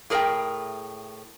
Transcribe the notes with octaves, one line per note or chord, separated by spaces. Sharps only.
A2 G#4 A#4 D5 E5 G5